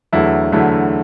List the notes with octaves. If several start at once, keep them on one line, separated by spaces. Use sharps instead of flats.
E2 D3 F#3 A3 E4
E2 D3 F#3 A3 E4